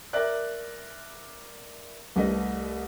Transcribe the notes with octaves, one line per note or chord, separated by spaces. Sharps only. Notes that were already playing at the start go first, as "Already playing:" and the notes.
A#4 D5 E5 F#6
C2 A3 B4 D#5